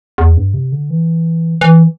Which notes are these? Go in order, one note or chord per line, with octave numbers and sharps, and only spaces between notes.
E2
G2
C3
D3
E3
E3